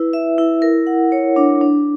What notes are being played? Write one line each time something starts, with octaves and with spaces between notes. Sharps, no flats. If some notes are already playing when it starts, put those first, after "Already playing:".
Already playing: E4 B4
E5
E4
A#4
F#5
C#5
D4
D4